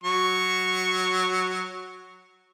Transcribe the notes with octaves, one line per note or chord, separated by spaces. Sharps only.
F#3 C#6